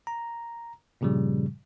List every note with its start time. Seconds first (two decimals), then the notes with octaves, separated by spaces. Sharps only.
0.07 A#5
1.01 G2 A#2 C#3 F3 G3